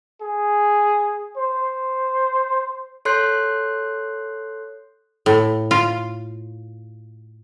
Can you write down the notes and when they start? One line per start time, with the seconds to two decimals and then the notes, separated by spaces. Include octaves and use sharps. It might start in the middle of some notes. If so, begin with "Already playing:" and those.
0.21 G#4
1.37 C5
3.05 A4 C#5 C6 F#6 G6 C7
5.26 A2
5.71 F4